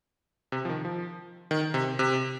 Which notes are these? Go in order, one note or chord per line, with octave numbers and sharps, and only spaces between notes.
C3
F3
D#3
F3
D#3
C3
C3